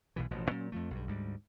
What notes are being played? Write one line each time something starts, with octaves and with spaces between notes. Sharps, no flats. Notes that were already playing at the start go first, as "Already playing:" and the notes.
B1 B2 E3
A1 B2 F3
A#2 F#3 C#4
F2 F3 A3
B1 G2
D2 G#2 G3